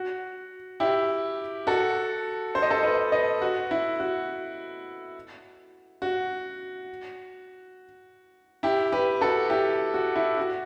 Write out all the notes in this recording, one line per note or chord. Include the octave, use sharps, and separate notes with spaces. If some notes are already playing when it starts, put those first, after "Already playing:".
Already playing: F#4
E4 G4
F#4 A4
C5
D#5
A4 C5
B4 D#5
B4 D#5
F#4
E4
F#4
F#4
E4 G4
G4 B4
F#4 A4
E4 G4
F#4
E4
F#4